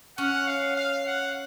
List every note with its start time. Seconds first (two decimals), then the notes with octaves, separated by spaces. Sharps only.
0.18 C#4 F#5
0.47 F5
0.76 F5
1.06 F#5